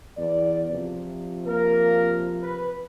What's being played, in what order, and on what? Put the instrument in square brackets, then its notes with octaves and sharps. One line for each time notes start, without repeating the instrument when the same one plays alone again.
[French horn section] E2 D5
C3 F3
[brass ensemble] A#3 A#4
B4